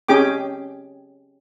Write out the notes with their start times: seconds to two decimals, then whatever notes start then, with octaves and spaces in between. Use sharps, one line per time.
0.09 C#4 G4 G#4 G5 D6